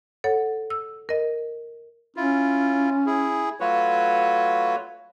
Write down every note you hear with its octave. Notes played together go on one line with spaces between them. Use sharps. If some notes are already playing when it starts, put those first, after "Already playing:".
A4 C#5 F#5
E6
A#4 D#5
C#4 E4 F4
E4 G#4
F#3 A3 F4 F#4 B4 C#5